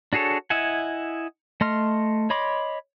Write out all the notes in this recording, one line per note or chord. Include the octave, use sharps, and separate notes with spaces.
D4 F#4 G#4 A4 C#5
E4 D#5 E5 F#5 G#5
A3 D#5 C6 F6
C#5 D#5 B5 C6 D6